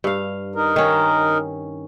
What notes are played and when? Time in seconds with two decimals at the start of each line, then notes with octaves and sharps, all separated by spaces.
0.04 G2 F5
0.56 D#4 A#4
0.76 D#3 C#4